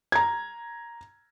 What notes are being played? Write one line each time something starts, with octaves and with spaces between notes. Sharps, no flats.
A#5 G#6